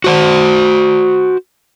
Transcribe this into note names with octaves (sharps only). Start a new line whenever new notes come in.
F#4 C5 F#5